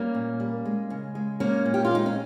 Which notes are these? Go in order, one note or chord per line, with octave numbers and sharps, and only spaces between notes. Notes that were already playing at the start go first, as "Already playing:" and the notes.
Already playing: G3 A#3 C#4
A#2
G3
G#3
C#3
G#3
G#3 A#3 C#4
A#2
G4
F4
G#3 D#4
C#4